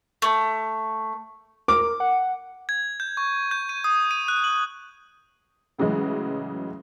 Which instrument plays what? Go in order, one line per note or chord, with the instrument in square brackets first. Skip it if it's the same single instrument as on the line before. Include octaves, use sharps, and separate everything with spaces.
[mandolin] A3
[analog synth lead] A#4 [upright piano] D6
[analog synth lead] F#5
[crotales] G#6
G6
C#6
G6
D#7
D#6
D#7
F#6
F#7
[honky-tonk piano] A2 C#3 E3 F#3 G#3